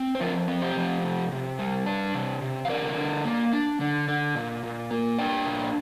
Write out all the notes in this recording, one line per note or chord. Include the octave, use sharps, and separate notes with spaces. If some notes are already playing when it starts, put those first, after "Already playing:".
Already playing: C4
C5
F3 F4 A#4
C4
G4 C5
F3
C3
C3
G3
D4
C3
C3
F5
D3 A#4 D5
D3
A#3
D4
D3
D3
A#2
A#2
A#3
D4 D5 G5
A#2